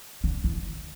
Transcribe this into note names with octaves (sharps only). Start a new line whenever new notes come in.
D3
E3